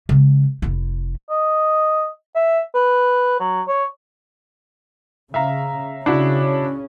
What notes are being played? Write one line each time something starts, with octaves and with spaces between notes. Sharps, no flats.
C#3 G#3
F1 E4
D#5
E5
B4
F#3
C#5
C#3 E5 F5 A#5
C#3 C#4 D4 E4 F#4